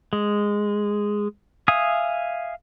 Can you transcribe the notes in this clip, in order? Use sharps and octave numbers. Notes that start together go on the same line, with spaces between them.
G#3
E5 F5 G#5 D#6